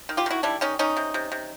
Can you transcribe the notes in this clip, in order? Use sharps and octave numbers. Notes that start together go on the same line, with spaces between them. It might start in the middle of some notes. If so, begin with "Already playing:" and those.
D#3
F4 G4
D#3 E4 F#4
G3 D4 E4
D#3 C#4 D#4
D#3 C#4 D#4
C3
C3
C3